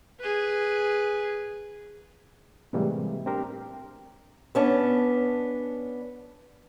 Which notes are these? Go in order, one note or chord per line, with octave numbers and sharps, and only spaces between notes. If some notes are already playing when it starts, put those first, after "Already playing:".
G#4 B4
A2 C3 E3 G3 G#3 A#3
C4 D4 G4 A#4 C5
B3 C#4 D4